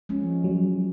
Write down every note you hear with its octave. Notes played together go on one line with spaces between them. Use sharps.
F3 G#3 C#4
F#3